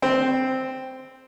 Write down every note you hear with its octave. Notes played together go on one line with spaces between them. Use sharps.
C4